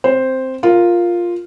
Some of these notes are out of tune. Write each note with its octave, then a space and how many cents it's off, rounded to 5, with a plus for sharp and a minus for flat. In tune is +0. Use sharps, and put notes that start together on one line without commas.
C4 +0 C5 +0
F4 +0 A#4 +0